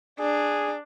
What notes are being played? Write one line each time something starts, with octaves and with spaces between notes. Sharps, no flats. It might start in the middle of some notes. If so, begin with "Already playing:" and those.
D4 G#4